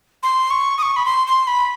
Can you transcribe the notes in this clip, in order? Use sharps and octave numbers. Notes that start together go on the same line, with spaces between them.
C6
C#6
D#6
C#6
B5
C6
C6
B5